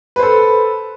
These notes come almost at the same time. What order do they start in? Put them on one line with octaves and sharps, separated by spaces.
B4 C5 A4